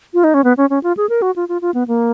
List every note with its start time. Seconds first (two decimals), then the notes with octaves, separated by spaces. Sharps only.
0.14 F4
0.24 D#4
0.34 C#4
0.44 B3
0.57 C#4
0.70 C#4
0.83 F4
0.97 G#4
1.09 A#4
1.22 F#4
1.36 F4
1.49 F4
1.62 F4
1.74 B3
1.88 A#3